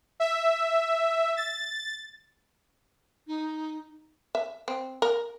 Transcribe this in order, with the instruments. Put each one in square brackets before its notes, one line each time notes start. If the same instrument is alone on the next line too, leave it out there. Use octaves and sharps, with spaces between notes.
[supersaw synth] E5
A6
[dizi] D#4
[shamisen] E5
C4
A#4